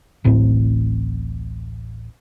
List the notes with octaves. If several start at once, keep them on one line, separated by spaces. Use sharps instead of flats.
D1 A1 A2 C4